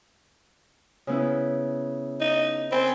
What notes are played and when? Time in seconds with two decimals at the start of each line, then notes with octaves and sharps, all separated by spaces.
1.07 C#3 B3 E4
2.21 D#4
2.72 C4 G#5 B5